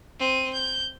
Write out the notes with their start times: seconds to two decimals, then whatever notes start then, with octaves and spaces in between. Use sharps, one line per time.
0.19 C4 D#7
0.53 G6